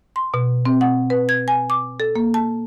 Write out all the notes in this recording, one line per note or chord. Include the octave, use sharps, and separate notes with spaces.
C6
B2
C4
F#5
B4
G#6
G#5
D6
A4
A#3
A5